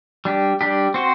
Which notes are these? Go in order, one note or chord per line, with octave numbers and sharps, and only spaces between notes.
G3 D4 G4
G3 D4 G4
C4 F#4 C5